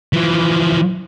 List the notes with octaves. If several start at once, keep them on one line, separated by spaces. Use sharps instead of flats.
E3 F3